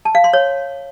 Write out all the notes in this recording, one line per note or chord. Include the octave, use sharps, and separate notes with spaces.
A5
F5
C6
C#5